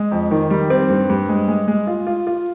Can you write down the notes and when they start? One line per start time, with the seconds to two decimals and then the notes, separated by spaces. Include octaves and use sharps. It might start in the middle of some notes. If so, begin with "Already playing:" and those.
Already playing: G#3
0.11 F2
0.31 D#3
0.50 G3
0.70 C4
0.89 G2
1.09 G2
1.29 G#3
1.48 G#3
1.68 G#3
1.87 F4
2.07 F4
2.27 F4